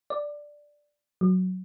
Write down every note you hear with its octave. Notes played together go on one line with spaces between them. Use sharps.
D5
F#3